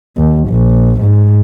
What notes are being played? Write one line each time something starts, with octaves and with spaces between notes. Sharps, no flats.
D#2
A#1
G#2